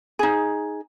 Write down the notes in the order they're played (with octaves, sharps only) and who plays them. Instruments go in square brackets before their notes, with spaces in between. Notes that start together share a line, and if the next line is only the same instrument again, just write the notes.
[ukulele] D#4 G#4